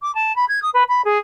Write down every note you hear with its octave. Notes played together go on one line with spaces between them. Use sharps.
D6
A5
B5
G#6
D#6
B4
B5
G#4